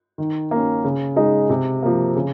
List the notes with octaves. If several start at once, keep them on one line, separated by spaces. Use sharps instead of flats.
D#3
A#3 C#4
C#3
G#3 D#4
C3
F3 A#3
C#3